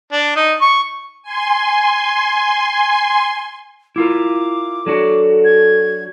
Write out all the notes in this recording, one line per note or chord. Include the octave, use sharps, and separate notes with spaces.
D4
D#4
C#6
G#5 C6
E4 F4 A#4 D6
F#3 D4 F#4 A4
G#6